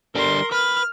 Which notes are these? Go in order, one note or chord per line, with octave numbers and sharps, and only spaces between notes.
D3 G3 A#4 C6
B4 F6